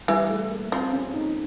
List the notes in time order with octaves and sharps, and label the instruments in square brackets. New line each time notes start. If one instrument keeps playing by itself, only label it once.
[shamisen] E3 [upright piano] G3
[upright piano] A3
A#3
[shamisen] F3 [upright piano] C4
[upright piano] C#4
D#4